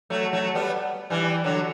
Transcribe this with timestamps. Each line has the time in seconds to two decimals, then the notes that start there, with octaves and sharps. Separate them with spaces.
0.10 F#3 A3
0.33 F#3 A3
0.55 G3 B3
1.10 E3 G3
1.44 D3 F#3